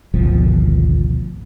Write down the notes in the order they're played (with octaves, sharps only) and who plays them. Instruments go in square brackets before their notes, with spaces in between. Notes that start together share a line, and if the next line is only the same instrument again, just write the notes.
[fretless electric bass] G#1 D2 B2 F3